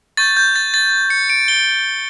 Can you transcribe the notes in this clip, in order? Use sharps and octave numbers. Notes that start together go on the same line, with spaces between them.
C#6 G6 A6
G6
A6
A6
C#7
D7
G7